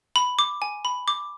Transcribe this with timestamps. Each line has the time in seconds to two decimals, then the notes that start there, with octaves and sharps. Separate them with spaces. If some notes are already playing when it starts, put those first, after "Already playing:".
0.16 B5
0.39 D6
0.62 G#5
0.85 B5
1.08 D6